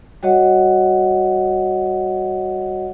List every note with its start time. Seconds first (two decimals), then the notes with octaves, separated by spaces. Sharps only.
0.23 G3 F#4 C#5 D#5 F#5